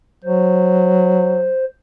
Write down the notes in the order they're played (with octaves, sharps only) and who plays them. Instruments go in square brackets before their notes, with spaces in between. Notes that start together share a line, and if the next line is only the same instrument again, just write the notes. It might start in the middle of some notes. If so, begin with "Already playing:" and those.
[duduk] F#3 [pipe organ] C5